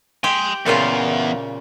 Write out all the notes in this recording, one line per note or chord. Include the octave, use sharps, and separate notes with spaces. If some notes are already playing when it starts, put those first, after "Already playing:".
G4 G#5 C6
E2 A#2 C#3 F4